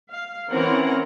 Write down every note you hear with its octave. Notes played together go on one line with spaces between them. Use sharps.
F5
E3 C4 C#4 A#4 F#5 A#5